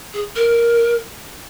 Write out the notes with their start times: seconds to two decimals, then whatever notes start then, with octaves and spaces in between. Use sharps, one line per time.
0.14 G#4
0.36 A#4